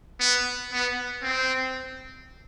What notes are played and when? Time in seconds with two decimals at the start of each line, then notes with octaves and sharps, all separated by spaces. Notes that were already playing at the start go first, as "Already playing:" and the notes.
0.20 B3
0.72 B3
1.23 C4